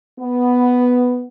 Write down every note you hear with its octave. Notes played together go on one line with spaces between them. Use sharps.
B3